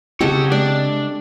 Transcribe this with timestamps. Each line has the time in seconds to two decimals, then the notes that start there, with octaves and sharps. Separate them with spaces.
0.20 C#3 G#3 C4 G4 A4 C#5 F#5
0.52 G#3 D4 D5